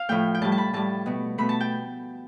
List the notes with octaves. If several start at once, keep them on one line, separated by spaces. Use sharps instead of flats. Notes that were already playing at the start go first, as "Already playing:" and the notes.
Already playing: F5
A2 F3 A3 G5
G5
A2 G3 A5
A5
B5
A2 G3 A5
B2 A3
B2 A3 B5
A5
G5